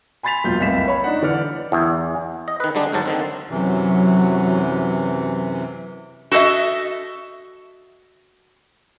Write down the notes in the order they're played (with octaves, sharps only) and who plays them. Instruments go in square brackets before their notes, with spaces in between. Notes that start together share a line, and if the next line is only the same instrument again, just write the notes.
[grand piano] G#5 B5 C6 A6 B6 F7
E1 F#2 A#2 F4 G6
F1 C2 F5 B6 E7
C#5 B5
D4 D#4 F#5
D3 E3 D5 F6 C#7
[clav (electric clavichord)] E2
D#5
D#3 B4
D3 G3 G#3 D4
D2 G#2 F#3 A5
D3 D#3 C4
[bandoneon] F#2 C3 E3 [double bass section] F#3
[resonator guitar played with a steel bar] F#4 A4 C5 D#5 E5